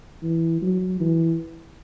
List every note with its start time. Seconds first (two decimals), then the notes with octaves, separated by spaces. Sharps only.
0.23 E3
0.62 F#3
1.00 E3